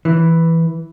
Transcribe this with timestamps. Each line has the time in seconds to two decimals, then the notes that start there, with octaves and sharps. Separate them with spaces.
0.05 E3